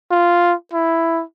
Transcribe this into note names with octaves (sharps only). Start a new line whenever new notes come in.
F4
E4